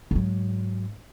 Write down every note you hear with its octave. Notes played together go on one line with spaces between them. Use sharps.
G#2 F#3